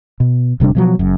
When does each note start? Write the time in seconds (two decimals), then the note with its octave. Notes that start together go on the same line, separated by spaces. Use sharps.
0.20 B2
0.60 D#1 C3 G3 D4
0.75 B2 F3 F#3
0.99 F#1 F#2